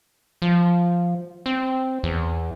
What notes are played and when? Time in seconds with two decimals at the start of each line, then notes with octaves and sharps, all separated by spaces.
0.42 F3
1.46 C4
2.03 E2